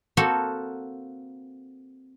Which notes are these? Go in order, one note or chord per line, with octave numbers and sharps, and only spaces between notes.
A#3 C4 F#4 A4